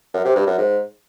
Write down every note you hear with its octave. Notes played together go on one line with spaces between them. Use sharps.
F#2
C3
G2
F#2
G#2